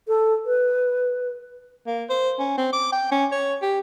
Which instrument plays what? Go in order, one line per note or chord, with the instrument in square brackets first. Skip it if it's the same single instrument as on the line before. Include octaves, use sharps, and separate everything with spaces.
[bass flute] A4
B4
[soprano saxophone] A#3
C5
C#4
C4
D6
G5
C#4
C#5
G4